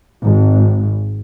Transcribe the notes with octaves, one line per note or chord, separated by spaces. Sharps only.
G#1